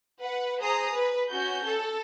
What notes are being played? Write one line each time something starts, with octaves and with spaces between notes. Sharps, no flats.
B4 F#5
G#4 C5 A#5 D#6
B4
C#4 F#4 G6
A4